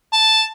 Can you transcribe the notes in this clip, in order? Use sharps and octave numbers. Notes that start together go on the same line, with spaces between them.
A5